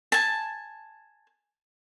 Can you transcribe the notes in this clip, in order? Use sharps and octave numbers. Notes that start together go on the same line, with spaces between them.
G#5 A5